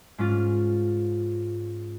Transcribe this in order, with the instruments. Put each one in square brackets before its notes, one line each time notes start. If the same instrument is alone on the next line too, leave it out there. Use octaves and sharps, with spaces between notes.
[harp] G#2 C#4 F4